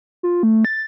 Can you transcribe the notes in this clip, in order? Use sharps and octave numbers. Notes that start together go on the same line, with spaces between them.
F4
A3
A6